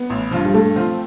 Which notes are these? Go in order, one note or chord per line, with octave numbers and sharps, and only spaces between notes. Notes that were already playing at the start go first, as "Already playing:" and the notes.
Already playing: B3
A1
G2 F3
G3
G2 A3
F3 C4 F4